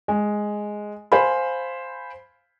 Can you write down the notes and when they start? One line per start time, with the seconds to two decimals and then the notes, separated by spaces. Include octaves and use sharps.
0.08 G#3
1.12 C5 F5 G#5 B5